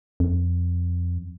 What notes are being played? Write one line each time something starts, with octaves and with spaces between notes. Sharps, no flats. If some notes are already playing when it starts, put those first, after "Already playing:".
F2